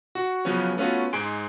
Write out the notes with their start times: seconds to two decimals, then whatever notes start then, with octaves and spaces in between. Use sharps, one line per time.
0.15 F#4
0.45 C#3 F3 F#3 B3 C#4
0.77 A3 B3 C#4 F4 F#4
1.13 G#2 G#3 G#5 C6 D7